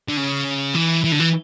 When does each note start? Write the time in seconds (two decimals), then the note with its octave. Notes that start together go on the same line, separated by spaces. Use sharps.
0.09 D3
0.17 C#3
0.75 E3
1.04 E3
1.12 D3
1.20 E3